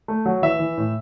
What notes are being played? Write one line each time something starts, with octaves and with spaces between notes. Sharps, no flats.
A3
F#3
E3 E5
E3
A2